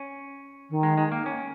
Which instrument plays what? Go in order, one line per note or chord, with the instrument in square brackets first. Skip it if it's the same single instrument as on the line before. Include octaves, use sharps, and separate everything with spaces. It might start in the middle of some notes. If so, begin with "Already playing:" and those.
Already playing: [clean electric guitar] C#4
[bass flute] D#3
[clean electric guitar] G#3
G#3
A#3
C#4